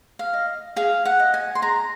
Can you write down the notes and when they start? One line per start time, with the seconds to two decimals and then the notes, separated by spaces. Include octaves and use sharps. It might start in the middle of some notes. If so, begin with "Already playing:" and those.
0.19 F5
0.33 D#5
0.76 G#4 F5
1.05 F#5
1.19 D#5
1.34 G#5
1.55 C6
1.62 G#4 A#5